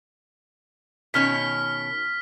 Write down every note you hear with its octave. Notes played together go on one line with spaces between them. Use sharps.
B2 D#3 C#4 F6 B6